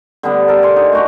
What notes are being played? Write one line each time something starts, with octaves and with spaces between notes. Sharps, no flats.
D3 G3 B3 D4
A4 A#4
D5 G#5 C6
D3 D#4
A3 F#4 G4